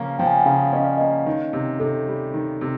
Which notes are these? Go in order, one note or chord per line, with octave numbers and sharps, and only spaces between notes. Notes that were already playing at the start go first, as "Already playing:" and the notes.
Already playing: C#3 F3 A#3 C#4
F3 G5
G#5
G5
F#5
C#3 F5
C#4 D#5
D5
A#3 D#5
D#3
C3
C3 A4
G3
D#3
C3